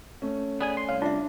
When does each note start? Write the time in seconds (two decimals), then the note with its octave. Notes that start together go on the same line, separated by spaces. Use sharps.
0.22 A3 C#4
0.61 B3 G#4 D5 G#5
0.77 C6
0.89 C2 C#5 F5
1.02 D4 F4 E5